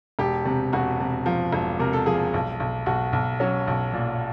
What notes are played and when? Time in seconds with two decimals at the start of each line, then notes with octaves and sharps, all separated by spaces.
0.19 E1 G4
0.45 C3
0.73 E1 F#4
1.00 C3
1.26 F3
1.53 E1
1.80 C3 A#4
1.93 A4
2.06 F3 G#4
2.34 B1
2.60 B1
2.86 B1 F#4
3.13 B1
3.40 F#3 C#4
3.67 B1
3.93 A#2